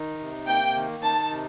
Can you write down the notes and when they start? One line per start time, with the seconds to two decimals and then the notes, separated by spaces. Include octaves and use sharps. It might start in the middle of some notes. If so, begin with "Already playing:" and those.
Already playing: D#3 D#4
0.19 C3
0.47 A#3 G5
0.75 D#3
1.03 D#4 A5
1.30 C3